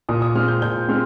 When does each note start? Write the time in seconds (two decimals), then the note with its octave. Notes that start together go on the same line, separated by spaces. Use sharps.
0.09 A#2 D#6
0.22 D#6
0.35 G#3 C4 F6
0.48 G6
0.62 A#2 G6
0.89 G#3 C4 F6